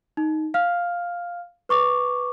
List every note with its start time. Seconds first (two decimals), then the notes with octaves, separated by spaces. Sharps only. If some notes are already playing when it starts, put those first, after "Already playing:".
0.17 D#4
0.54 F5 F6
1.69 B4 C#6 D6